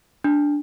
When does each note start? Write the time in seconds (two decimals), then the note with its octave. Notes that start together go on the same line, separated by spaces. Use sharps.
0.24 D4